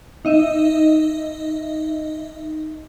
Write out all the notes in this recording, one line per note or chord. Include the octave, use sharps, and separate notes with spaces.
D#4 D#5 E5